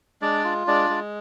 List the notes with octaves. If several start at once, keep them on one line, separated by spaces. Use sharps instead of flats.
G#3 D4 D5
F4
G#3 D4 D5
G#3